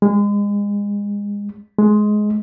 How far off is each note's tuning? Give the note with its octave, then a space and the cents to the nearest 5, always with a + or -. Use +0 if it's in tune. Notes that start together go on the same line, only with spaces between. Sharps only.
G#3 -30
G#3 +15